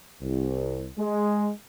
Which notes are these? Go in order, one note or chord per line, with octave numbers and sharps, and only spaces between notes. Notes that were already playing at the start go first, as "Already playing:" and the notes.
C2
G#3